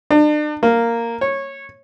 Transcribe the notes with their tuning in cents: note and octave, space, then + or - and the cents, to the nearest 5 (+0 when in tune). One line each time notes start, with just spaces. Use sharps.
D4 +40
A#3 -5
C#5 -15